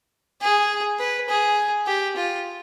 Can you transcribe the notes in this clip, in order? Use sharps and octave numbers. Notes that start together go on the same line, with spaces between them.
G#4
B4
G#4
G4
F4